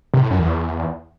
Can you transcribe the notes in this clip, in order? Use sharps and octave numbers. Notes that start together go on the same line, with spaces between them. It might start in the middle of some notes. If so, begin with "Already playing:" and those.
C3
A2
F#2
E2